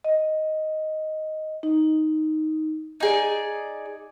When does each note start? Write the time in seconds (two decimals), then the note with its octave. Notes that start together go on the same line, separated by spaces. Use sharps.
0.04 D#5
1.63 D#4
3.00 D#4 G#4 D5